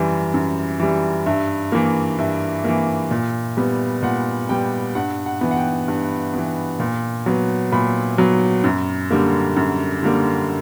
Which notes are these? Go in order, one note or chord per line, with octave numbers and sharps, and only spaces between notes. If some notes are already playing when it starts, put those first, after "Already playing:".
Already playing: F#2 E3 G3
F#2
E3 G3
G2 E5
E3 A#3
G2 E5
E3 A#3
A#2
G3 B3
A#2 F#5
G3 B3 G5
G2 F#5
F#5
E3 B3
F#5
G5
G2
E3 B3
A#2
F#3 B3
A#2 B5
F#3 B3
F#2
D3 G3 A#3
F#2
D3 G3 A#3